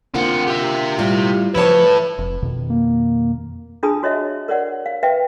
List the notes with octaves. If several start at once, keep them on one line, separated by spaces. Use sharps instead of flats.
D3 A#3 C4 F4 F#5
G4 E5
A2 G3 F4
C#3 F3 E4 B4 C#5 A5
F1
F2 B2 D#3
A#3
D4 F4 G#4 A5 B5 D#6
F#4 C#5 D#5 E5
A#4 C#5 D5 F#5
F5
B4 E5 F5 G5